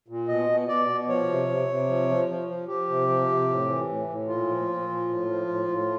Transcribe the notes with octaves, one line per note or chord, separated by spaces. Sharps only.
A#2
B2 D#5
B2
B2 D5
B2
F3 C#5
C3
C3
C3
F3
F3
F3
F3
F3 G4
C3
F3
C3
A2
E3
A2
A2
A#2 F4
F3
A#2
F3
A2
F3
A2
A2